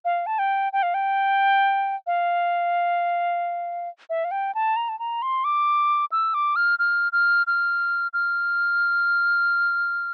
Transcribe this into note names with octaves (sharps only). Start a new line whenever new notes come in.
F5
A5
G5
G5
F5
G5
F5
E5
F5
G5
A5
A#5
A5
A#5
C6
D6
E6
D6
F6
F6
F6
F6
F6